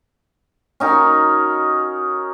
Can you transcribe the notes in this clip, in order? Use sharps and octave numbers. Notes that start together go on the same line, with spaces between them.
C#4 D#4 F#4 A#4